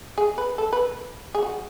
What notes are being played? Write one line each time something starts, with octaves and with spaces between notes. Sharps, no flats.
G#4
B4
A4
B4
G#4
F#4